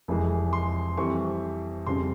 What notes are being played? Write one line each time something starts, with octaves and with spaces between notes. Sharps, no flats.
F1 F2 E3 G#3
C6
F2 E3 G3 C4 C#6
F2 C#3 G3 C4 C6